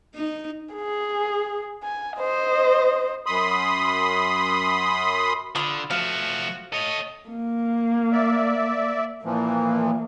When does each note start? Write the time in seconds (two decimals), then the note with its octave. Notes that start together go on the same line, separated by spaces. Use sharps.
0.15 D#4
0.74 G#4
1.84 G#5
2.18 C5 D#5
3.26 F#2 B5 C6 D#6
5.55 D3 F4 B5 D#6
5.90 F3 A3 F#4 F5
6.73 A4 C#5 D#5
7.29 A#3
8.13 D5 E5
9.25 A#2 E3 F3 A#3